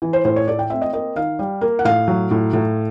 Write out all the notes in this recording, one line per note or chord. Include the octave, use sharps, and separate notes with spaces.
E3
C5
A2 C5
C#5
A3 D5
G5
C4 E5
D#5
A#3 D#5
D#3 F5
G3
A#3
F#5
A2 F5
F#3
A2
A2